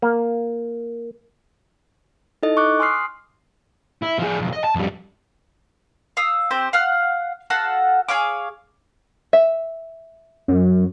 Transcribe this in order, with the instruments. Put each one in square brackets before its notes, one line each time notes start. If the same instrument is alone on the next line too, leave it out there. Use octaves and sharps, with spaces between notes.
[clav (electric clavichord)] A#3
[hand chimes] D#4 E4 A4 D#5
C#6 D6 F#6
G#5 C6 D#6 F6 C7
[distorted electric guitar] E4
F3 G#4
B1 F2
D#5
A5
F2 G3
[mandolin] F5 D#6 E6
C4 G4 C5
F5 F#5 F6
F#4 A4 F5 F#5
G#4 C#5 F5 D6
[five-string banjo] E5
[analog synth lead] F#2